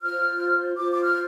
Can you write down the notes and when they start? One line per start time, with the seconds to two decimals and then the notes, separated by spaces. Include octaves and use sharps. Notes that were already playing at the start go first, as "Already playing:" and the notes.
0.02 F4 C5 F6
0.77 F4 C5 D6
0.92 D6
1.02 F6